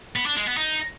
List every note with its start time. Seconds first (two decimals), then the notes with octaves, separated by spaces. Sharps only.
0.16 B3
0.26 D4
0.37 G#3
0.47 B3
0.58 D#4